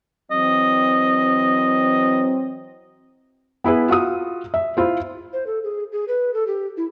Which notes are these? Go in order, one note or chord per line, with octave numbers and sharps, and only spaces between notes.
E3 F#3 C4 D#5
B3 E4 G#4 B4
F4 F#4 D#6
E5
E4 F4 C5
C5
A4
G#4
G#4
B4
A4
G4
E4